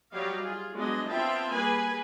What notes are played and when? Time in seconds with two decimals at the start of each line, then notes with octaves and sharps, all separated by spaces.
0.12 F#3 G3 G4 C#5 D#5 F5
0.42 F4 G#4
0.74 F#3 G#3 B3 D4 B4 D#5
1.08 B3 C4 F4 E5 G5 A5
1.49 G3 A#3 G#4 B4 G#5 B5